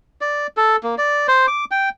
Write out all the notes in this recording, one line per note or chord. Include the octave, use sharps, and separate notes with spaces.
D5
A4
A#3
D5
C5
D6
G5